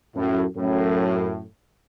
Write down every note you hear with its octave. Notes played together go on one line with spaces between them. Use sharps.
F#2 A2
F#2 A2